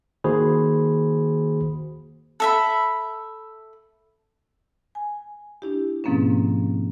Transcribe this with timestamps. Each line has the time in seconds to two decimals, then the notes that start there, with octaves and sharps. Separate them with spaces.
0.24 D#3 A#3 F#4 G#4 C5 B5
2.40 A4 E5 B5
4.95 G#5
5.62 D4 E4 G4
6.04 G#2 B2 F3 A#3 C4 C#4